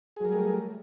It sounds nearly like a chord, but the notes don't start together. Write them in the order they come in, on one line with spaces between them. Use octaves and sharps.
G#4 F#3 A#4 G3 A3